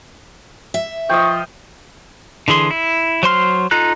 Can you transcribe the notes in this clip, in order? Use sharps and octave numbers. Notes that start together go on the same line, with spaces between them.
E5
F3 D#5 G5 C#6
D3 E3 G#4 C6
E4
F#3 C5 C6 F6
D#4 F4 A4 A#5 F#6